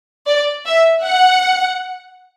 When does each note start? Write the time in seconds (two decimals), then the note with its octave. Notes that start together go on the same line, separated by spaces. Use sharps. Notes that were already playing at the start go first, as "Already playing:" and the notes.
0.27 D5
0.66 E5
1.05 F#5